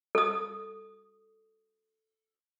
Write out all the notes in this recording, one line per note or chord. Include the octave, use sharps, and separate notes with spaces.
A4 D#6